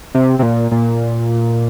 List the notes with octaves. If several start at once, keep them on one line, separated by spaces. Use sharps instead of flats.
C3
C3
A#2
A#2